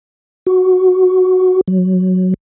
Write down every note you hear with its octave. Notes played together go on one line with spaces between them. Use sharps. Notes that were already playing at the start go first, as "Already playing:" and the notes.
F#4
F#3